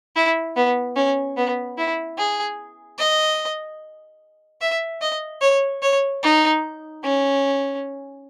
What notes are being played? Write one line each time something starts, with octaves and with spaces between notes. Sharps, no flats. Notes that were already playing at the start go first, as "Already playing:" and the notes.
E4
B3
C#4
B3
E4
G#4
D#5
E5
D#5
C#5
C#5
D#4
C#4